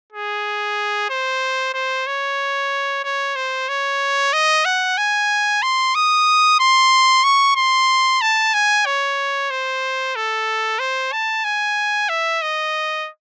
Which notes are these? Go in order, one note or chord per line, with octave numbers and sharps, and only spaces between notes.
G#4
C5
C5
C#5
C#5
C5
C#5
D#5
F#5
G#5
C6
D#6
C6
C#6
C6
A5
G#5
C#5
C5
A4
C5
A5
G#5
E5
D#5